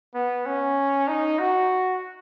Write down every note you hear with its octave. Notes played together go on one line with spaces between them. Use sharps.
B3
C#4
D#4
F#4